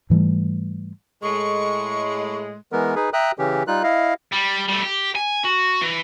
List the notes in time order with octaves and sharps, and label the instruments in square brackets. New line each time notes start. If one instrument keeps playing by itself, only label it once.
[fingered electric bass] G#2 E3 G3 A3
[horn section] A2 G#3 [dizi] C#6
[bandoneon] E3 G#3 B3 A#4
D#4 G#4 B4
E5 G5 A#5 D#6 F#6
C#3 E3 C#4 G4
G3 D#4 F4 F#6
E4 D#5 F5
[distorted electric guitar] G3
G3 A3
G4
G#5
F#4
E3